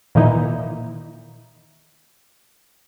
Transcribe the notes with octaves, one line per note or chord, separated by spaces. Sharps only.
A#2 D#3 E3 A#3 D#4 E4